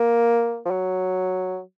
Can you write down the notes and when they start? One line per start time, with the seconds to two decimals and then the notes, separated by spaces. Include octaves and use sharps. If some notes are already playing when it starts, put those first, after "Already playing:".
Already playing: A#3
0.66 F3
0.71 F#3